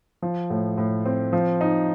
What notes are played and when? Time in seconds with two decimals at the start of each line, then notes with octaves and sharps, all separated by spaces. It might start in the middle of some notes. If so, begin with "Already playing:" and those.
0.22 F3
0.50 A2
0.78 A2
1.06 C4
1.33 F3
1.61 D#4